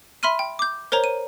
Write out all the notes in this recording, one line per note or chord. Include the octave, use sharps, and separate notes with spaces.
E5 B5 C6 F6 D#7
G5
D6 G6
A#4 C5 C#5 A#5
D#7